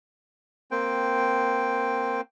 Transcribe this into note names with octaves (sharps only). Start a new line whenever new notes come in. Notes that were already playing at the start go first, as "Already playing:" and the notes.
A#3 C4 G5